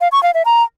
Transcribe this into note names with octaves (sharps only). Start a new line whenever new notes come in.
F5
C#6
F5
E5
A#5